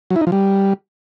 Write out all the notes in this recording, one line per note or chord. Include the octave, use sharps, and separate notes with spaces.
F#3
E4
D#4
F3
G3